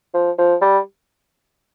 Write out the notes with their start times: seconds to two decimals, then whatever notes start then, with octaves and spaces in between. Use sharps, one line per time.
0.14 F3
0.38 F3
0.61 G3